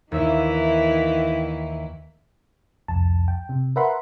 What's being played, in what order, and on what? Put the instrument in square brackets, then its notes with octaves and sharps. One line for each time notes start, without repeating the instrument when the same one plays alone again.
[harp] D#2 E5 [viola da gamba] D#3 E3 E4
[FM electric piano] C2 F2 A5
G5
C3
A#4 B4 E5 F#5 B5 C6